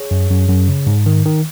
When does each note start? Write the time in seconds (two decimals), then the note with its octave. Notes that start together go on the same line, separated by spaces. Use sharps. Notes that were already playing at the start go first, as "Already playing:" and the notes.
Already playing: G#4 C#5
0.11 F#2
0.30 F#2
0.49 F#2
0.68 C#3
0.87 G#2
1.06 D#3
1.26 D#3